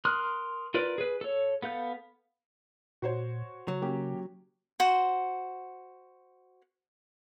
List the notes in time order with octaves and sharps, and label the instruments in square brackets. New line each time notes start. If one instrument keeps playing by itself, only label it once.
[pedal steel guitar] A#4 C6 D#6 F6 F#6
F4 A#4 B4 D5
G#4 B4
A4 C#5
B3 A4 F5 G6
[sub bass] A#2 [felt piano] F#4 C5 C#5
[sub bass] C#3 [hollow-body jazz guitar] F#3
[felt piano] A#3 C#4 G4
[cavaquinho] F#4 C5